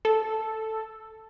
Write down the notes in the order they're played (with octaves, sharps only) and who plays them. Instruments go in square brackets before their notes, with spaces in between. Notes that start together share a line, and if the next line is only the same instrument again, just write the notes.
[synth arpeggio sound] A4